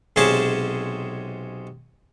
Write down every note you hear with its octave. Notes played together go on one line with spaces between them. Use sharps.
B1 C3 G#3 C#4 G#4 A5